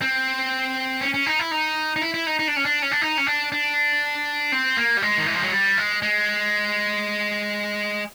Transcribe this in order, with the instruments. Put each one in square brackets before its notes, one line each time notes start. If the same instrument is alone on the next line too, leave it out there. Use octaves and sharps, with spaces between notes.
[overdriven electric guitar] C4
C#4
C#4
D#4
E4
D#4
D#4
E4
E4
D#4
D#4
D4
C#4
D4
C#4
D4
D#4
C#4
D4
D4
C4
A#3
G3
G#3
D#3
E3
F3
F#3
G3
G#3
G#3